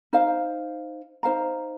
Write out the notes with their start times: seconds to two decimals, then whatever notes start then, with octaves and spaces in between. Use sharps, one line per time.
0.13 D#4 C5 F5
1.23 D#4 C5 F5 A#5